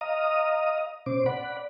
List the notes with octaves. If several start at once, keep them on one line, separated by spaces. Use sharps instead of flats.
D#5 F5 A#5 D#6
B2 C#4 C5 D6
D5 F#5 B5